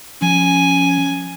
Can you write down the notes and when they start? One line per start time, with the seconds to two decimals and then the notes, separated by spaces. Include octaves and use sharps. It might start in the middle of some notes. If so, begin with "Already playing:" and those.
0.22 F3 C#4 G#5